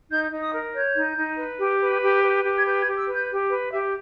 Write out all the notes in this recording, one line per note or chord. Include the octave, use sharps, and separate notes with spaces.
D#4 G6
D#4
D#6
A#4
C#5 G6
D#4
D#4
B4
G4
B4
G4
B4
G4
G#6
B4 G6
G#6
G4
E6
B4
G6
G4
B4
G4 E5